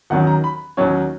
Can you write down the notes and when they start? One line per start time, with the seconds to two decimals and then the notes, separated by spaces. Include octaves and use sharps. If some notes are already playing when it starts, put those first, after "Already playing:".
0.10 D#2 D#3 F#3 C#4 F#5
0.27 A#5
0.44 B5
0.77 D#2 D#3 F#3 C#4 C#5